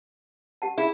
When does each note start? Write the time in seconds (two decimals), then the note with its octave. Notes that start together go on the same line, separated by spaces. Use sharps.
0.62 G4 F#5 A5
0.78 E4 G#4